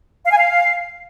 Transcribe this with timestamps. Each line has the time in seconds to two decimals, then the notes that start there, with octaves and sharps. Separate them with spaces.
0.25 F5
0.31 G#5
0.37 F5